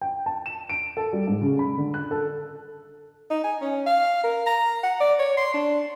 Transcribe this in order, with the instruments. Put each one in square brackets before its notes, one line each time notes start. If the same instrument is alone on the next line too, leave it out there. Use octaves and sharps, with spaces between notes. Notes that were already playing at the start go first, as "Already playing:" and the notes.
[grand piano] G5
A5
E7
D7
A4
G3
G#2
C#3
B5
D3
F#6
A4
[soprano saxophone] D#4
G#5
C#4
F5
A#4
A#5
F#5
D5
C#5
C6
D4